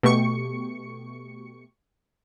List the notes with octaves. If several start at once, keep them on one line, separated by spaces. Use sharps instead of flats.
B2 A3 G4 C#6 C#7